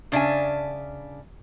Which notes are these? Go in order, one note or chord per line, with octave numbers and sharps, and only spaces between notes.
C#3 D4 E5 G#5